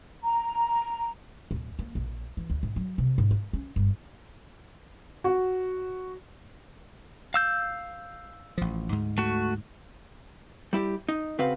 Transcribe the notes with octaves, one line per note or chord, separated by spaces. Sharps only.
A#5
D1
A#3
A#1
E3
D2
G#2
F#3
C3
G#2
A#3
C#4
G1
F#4
F5 E6 G6
A1 F3
D2 G#2
A3 F#4
G3 E4 G4
D#4
C#3 C4 F#4 B4 F5